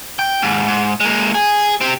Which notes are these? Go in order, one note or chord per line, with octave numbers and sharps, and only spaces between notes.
G5
D#2 G#2
G#2
G#3 A#3
G#4
C4 G4